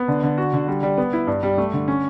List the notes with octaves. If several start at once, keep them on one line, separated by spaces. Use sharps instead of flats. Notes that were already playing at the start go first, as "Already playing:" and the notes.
Already playing: B3
D3
D3
F#4
D3
G3
G3
B3
E4
G2
G3
A3
D3
C#4